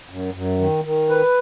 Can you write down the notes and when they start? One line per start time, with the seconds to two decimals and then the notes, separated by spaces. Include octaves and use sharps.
0.10 F#2
0.34 F#2
0.59 D#3
0.84 D#3
1.09 B4